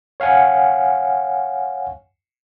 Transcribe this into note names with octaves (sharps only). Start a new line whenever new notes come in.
C#5 F5 F#5 G#5